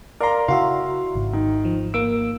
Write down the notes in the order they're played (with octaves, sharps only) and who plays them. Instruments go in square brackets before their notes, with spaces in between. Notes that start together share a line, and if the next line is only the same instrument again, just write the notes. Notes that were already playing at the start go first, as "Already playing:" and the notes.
[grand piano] A#4 A#5 [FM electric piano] D5 F5 C6
[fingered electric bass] C#3 [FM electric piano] E4 F#4 E5 [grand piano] F5 C6
[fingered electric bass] G#1
[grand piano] D#3
[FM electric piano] F3
[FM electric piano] A#3 E6 [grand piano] D7